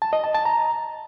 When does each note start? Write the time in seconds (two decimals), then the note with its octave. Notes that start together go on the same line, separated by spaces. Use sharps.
0.02 A5
0.13 D#5
0.24 A5
0.35 A5
0.45 A#5